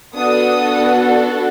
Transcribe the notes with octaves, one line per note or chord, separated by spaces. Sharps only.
B3 D4 F#4 A4 D#6